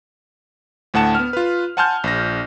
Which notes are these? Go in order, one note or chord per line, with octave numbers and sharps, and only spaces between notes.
D2 A2 F#5 A5 E7
B3 F6
F4 B4
F#5 G#5 A5 C6 F6 G6
A#1 A#6